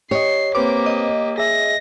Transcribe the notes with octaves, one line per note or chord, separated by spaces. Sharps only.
G4 C#5 D#5 C7
A#3 C4 G4 B4 C5 D6
D#5
G#4 E5 A#6